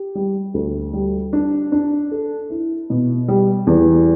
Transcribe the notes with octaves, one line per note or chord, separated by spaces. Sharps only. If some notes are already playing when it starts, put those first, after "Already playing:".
Already playing: G4
G3
D2
G3
D4
D4
A4
E4
B2
G3
E2